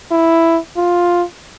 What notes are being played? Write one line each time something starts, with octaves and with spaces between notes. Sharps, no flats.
E4
F4